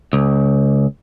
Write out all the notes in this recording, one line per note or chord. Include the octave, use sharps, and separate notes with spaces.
C#2